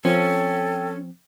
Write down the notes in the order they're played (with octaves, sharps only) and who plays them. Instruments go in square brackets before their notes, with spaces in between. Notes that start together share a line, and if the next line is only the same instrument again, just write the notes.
[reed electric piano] F3 C4 [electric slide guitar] C#4 [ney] A4 [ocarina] G5